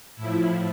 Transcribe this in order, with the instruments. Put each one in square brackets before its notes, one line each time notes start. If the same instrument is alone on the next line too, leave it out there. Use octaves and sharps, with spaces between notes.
[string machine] A2 F3 E4